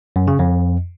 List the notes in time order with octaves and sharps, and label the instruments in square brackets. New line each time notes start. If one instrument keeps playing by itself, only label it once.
[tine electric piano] F#2
C#3
F2